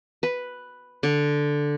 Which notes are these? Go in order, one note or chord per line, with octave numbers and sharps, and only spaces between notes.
B4
D3